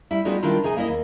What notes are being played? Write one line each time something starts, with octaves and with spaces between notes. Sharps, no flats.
G3 E4
G3 G#3 B3 D#4 F4 F#4
D#3 G3 D4 E4 F4
C3 D#4 G#4 D#5 G5 G#5
A#3 E4 D#5
D#2